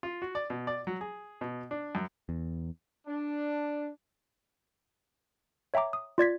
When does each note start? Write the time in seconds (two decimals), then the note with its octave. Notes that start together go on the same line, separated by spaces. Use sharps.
0.03 F4
0.22 F#4
0.35 D5
0.50 B2
0.67 D5
0.87 F#3
1.01 G#4
1.41 B2
1.71 D4
1.95 F#2
2.29 E2
3.07 D4
5.74 C#5 E5 G5 A#5 D6
5.93 D#6
6.18 F4 D5 G#6 B6